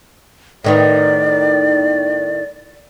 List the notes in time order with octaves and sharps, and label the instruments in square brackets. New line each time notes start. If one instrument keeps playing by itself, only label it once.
[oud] A2 D#3 B3 [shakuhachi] D5